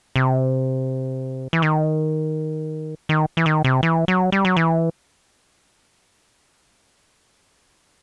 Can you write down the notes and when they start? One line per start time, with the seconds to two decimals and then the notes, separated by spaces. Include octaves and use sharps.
0.16 C3
1.53 E3
1.62 D#3
3.09 D#3
3.37 E3
3.46 D#3
3.64 C3
3.83 E3
4.08 F#3
4.32 G3
4.45 F#3
4.56 E3